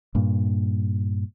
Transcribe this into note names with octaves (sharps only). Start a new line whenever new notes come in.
G2 A#2